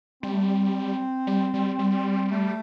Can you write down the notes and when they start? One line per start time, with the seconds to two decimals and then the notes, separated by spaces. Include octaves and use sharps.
0.23 G3 C4
0.32 A3
0.42 C4
1.27 G3
1.54 G3
1.79 G3
2.31 A3